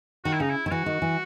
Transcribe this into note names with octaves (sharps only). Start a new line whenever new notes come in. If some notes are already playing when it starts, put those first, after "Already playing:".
D#3 F#4
E4
C#3 D#4
E4
D#3 E4
E3 F#4
D#3
E3